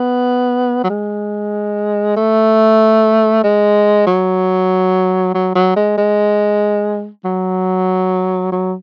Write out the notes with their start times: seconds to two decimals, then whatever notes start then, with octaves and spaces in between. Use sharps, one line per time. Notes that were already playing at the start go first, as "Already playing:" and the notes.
Already playing: B3
0.84 F#3
0.89 G#3
2.17 A3
3.44 G#3
4.07 F#3
5.34 F#3
5.55 F#3
5.76 G#3
5.98 G#3
7.25 F#3
8.52 F#3